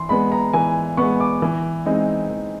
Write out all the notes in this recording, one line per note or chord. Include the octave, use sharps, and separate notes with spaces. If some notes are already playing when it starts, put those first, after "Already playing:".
Already playing: E3 C6
G#3 B3 B5
A#5
E3 G#5
G#3 B3 C#6
D6
E3
G#3 C4 D#4
E3